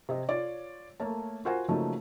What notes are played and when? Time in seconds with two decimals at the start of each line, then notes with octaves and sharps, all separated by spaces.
0.09 C3 D#5
0.29 F4 C#5 D5
1.00 A3 A#3 C#5 A5
1.45 F4 F#4 A#4 C5 F#5 G#5
1.68 C#3 F3 F#3 A3 A#3 D#4